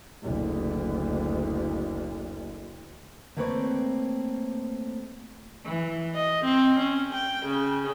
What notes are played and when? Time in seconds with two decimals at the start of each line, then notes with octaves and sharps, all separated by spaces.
0.22 F#1 D2
3.37 A3 A#3 C4 B4 C#5 D5
5.65 E3
6.14 D#5
6.44 C4
6.79 C#4
7.14 G5
7.46 C#3